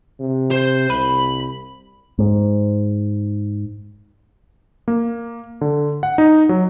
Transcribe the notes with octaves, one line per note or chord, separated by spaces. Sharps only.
C3
C5
C2 B5
G#2
A#3
D3
F#5
D#4
F#3